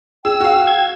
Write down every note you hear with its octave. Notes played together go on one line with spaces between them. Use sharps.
G#4 G5 E6
F#4 F5
G#6